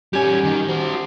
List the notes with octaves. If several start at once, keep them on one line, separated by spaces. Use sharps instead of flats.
G3 C#4 G4 G#5
D#3
F#4 C5